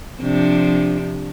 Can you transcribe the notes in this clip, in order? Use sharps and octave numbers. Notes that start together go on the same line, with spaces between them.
C3 F3 D4